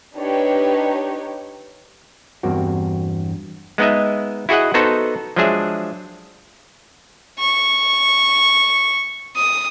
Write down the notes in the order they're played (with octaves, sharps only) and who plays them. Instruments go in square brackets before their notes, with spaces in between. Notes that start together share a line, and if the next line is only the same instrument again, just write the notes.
[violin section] D4 D#4 G4 B4 C#5
[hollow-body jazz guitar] E2 G2 A#3 C4 F#4
[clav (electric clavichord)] G#3 B3 D#4 D#5 E5
E4 F#4 G#4 D#5 F#5
B3 D#4 F#4 A4 C5
F3 F#3 G#3 D4 G#4 E5
[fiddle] C#6
D#6